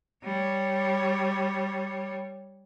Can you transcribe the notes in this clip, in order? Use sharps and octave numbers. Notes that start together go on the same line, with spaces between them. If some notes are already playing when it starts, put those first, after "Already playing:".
G3 C#5